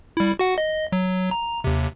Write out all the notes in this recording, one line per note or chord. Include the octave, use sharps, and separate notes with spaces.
G3 E4
F#4 F#5
D#5
F#3
A#5
D#2 C3